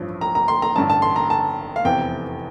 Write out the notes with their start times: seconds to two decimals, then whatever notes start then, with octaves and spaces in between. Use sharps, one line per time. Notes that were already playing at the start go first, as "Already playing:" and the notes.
Already playing: A1 G2 F3
0.21 A#5
0.35 A#5
0.48 C6
0.62 A#5
0.75 A1 G2 D3 A5
0.90 A5
1.02 C6
1.16 A#5
1.30 A5
1.76 F5
1.85 F1 E2 C3 E3 G5